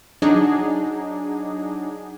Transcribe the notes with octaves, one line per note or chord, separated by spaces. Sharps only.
F#3 D4 D#4 G#4